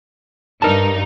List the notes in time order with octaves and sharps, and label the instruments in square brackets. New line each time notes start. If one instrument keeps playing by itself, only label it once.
[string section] G2 D#4 [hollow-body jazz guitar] A#4 A5